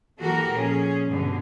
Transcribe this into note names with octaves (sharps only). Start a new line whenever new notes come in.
E3 A#3 F#4 G4 A4 A#4
A#2 F3 C#4 G#4
G2 B2 D3